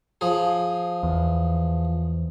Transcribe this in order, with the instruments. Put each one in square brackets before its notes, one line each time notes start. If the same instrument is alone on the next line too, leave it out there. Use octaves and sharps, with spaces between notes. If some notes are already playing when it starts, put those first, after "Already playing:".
[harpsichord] F3 G#4
[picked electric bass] E2